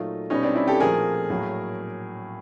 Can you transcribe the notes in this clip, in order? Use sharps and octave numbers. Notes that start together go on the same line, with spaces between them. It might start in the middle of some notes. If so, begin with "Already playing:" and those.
Already playing: A#2 F#3 A3 D#4 F4
B2 G3 B3 C#4 D#4
C4 D4
D4 E4
G4 A4
A#2 F3 A3 G#4 A#4
A2 F#3 A#3